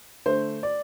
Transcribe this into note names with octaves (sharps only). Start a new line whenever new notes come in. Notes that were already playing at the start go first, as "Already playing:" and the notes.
D3 A3 C5
D5